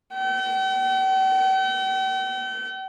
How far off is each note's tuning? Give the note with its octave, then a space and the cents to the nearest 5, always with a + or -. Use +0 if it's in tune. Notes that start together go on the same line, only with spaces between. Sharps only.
G5 -45